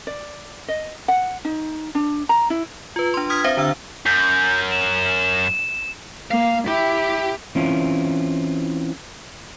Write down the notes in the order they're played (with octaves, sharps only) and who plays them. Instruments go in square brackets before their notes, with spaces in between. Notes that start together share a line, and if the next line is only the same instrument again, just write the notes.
[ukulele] D5
D#5
F#5
D#4
D4
A#5
E4
[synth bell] F4 B4
D4 C6
D#6 F6 G#6 B6
C4 C5 E5 F5 A#6
D3 D4 E6
[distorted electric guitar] F#2 [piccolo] G6
[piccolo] E7
[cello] A#3 [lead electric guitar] F5
[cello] E4 [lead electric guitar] G4
[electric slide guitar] E3 C4 C#4 E4 F4